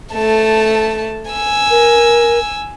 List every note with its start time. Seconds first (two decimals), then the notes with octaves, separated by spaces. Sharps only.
0.13 A3 A5
1.31 G#5 E6
1.70 A#4